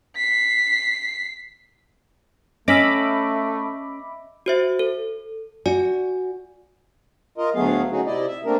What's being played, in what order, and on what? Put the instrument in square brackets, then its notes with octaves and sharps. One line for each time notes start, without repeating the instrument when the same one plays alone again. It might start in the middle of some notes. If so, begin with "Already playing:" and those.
[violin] B6 C7
[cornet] A3 [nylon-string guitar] C#4 [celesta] D#5 A#6 [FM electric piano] E5 B5 D6
[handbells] F#4 C5 E5
A4
[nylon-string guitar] F#4 [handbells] D5 G#5
[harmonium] F4 A#4 D#5
D2 F#3 A3 B3 G#4 F5
A3 C#4 D#4 F#4 G#4
C3 E4 D5 D#5
E5
A3 A#3 C4 D4 A#4